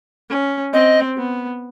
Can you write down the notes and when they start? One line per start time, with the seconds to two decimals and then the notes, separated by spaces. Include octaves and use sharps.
0.30 C#4
0.73 C4 D#5
1.17 B3